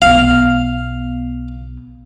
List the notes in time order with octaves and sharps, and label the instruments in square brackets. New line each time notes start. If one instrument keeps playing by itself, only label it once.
[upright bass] B1 B3 [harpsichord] F5